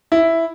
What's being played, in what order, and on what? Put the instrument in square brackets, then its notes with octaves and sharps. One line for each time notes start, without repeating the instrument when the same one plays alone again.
[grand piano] E4